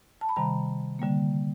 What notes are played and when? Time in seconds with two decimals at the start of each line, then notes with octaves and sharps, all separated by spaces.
0.21 A5
0.29 B5
0.36 C3 D#3 G3 A#5
0.99 D3 G3 A#3